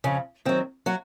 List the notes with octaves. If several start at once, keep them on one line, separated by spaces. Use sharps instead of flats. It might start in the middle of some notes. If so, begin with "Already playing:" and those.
F2 C#3 C#4
D#3 F#3 C4
F#3 F#4